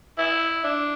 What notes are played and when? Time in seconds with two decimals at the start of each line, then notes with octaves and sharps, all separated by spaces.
0.18 E4
0.64 D4